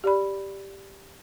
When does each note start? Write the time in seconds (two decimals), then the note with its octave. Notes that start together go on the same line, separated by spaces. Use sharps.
0.04 G4 D5 B5